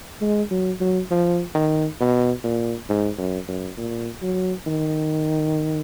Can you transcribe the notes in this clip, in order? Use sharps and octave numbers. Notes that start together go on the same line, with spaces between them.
G#3
F#3
F#3
F3
D#3
B2
A#2
G#2
F#2
F#2
A#2
F#3
D#3